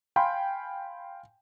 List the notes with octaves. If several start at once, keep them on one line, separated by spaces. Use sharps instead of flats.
F5 G5 G#5 B5 C6